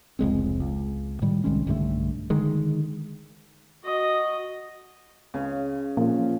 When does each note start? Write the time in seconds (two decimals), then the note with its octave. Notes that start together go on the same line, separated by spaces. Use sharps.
0.19 F1 C#2 G#3 C4
0.60 C#2
1.22 A2 D#3 G3
1.44 C2 D#3 G#3 C#4
1.67 B1 G2 D3 A3
2.30 D3 D#3 G#3
3.83 F#4 D#5
5.34 C#2 C#3 G#4 G#5
5.97 A#2 F3 C#4